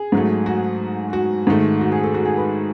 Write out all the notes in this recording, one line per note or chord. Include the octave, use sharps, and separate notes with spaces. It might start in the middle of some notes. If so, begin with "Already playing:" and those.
Already playing: G#4
G#2 F#3 A3
F#4
F#4
G#2 D#3 A3
F#4
G#4
A4
F#4
G#4
B4